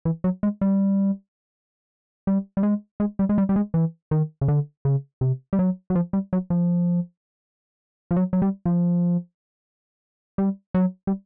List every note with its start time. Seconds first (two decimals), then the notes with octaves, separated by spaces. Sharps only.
0.05 E3
0.24 F#3
0.43 G#3
0.61 G3
2.27 G3
2.57 G3
2.63 G#3
3.00 G#3
3.19 G3
3.29 G#3
3.38 G3
3.49 G3
3.56 G#3
3.74 E3
4.11 D#3
4.41 C#3
4.48 D3
4.85 C#3
5.21 C3
5.53 G3
5.59 F#3
5.90 F#3
5.95 F3
6.13 G3
6.33 F#3
6.50 F3
8.11 F3
8.16 F#3
8.33 F#3
8.42 G3
8.66 F3
10.38 G3
10.74 F#3
11.07 G3